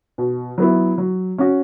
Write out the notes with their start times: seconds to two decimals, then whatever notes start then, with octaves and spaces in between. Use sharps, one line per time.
0.18 B2
0.58 F#3 B3 E4
0.98 F#3
1.38 C#4 F#4